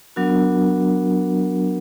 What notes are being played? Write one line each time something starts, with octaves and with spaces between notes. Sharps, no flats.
F#3 B3 D4 F#4 A#4